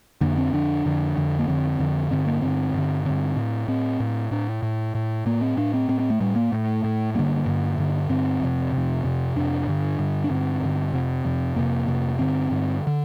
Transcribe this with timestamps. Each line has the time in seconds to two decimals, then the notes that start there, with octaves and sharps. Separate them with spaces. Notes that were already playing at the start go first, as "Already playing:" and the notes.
0.21 F2 D3 A#3
0.38 C4
0.53 F2 D3 D4
0.85 F2 D3
1.17 F2 D3
1.39 A#3
1.48 F2 D3 C4
1.79 F2 D3
2.10 G2 D3 C4
2.27 A#3
2.42 G2 D3 C4
2.74 G2 D3
3.05 G2 D3 C4
3.36 A2
3.68 A2 C4
4.00 A2
4.31 A2 D4
4.63 A2
4.95 A2
5.26 A2 A#3
5.41 C4
5.57 A2 D4
5.74 C4
5.89 A2 C4
5.99 C4
6.10 A3
6.20 A2 G3
6.36 A#3
6.52 A2 A3
6.84 A2
7.15 G2 D3 A#3
7.46 G2 D3
7.78 G2 D3
8.09 G2 D3 C4
8.41 F2 C3
8.72 F2 C3
9.04 F2 C3
9.36 F2 C3 D4
9.67 G2 D3
9.99 G2 D3
10.24 D4
10.30 G2 D3 C4
10.62 G2 D3
10.93 F2 C3 C4
11.25 F2 C3
11.56 F2 C3 A#3
11.88 F2 C3
12.19 G2 D3 C4
12.51 G2 D3
12.87 D3